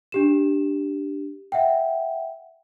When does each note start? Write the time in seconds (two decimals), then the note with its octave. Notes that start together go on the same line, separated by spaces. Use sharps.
0.12 D4 G4 E7
1.52 E5 F#5 G5